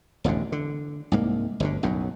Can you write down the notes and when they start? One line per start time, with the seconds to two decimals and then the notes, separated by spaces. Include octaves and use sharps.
0.24 E1 A1 F2 D3
0.52 D3
1.12 C2 G#2 A#3
1.60 G1 D2 B2 D3
1.83 B1 F#2 A2